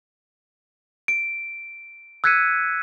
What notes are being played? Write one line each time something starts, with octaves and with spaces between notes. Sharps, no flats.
D7
E6 F#6 G#6 B6 C#7 D#7